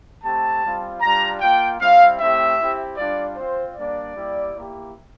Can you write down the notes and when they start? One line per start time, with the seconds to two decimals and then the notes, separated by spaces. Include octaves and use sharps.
0.23 A3 C4 G4 A5
0.62 G3 C4 F4
1.01 G3 D4 F4 A#5
1.40 A#3 F4 G5
1.79 G3 C4 E4 F5
2.19 A3 C4 E4 G4 E5
2.58 C4 E4 G4
2.97 G3 D4 F4 D5
3.37 C4 F4 C5
3.75 G3 A#3 D4 D5
4.15 G3 A#3 E4 G4
4.54 A#3 E4 G4